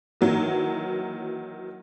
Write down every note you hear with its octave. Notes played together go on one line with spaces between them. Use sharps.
D#3 E3 F#3 A#3